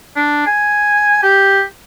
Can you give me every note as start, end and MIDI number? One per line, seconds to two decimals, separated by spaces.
0.16 0.44 62
0.47 1.18 80
1.23 1.62 67